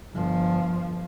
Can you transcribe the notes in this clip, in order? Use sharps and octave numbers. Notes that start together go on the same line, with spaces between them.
G1 F3